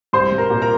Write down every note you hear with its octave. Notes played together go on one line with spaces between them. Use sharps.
C2 C5 C6
C2
A#4 A#5
A#2
A#4 A#5